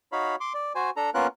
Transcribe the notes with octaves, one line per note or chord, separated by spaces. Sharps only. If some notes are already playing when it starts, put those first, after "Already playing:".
D#4 F#4 C#5 F5 B5
C6 D6
D5
F#4 C5 G#5
D4 A4 A#5
A#3 B3 C#4 F4 A#4 F#6